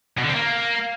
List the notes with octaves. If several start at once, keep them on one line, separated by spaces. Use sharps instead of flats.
B2
D3
C4
A#3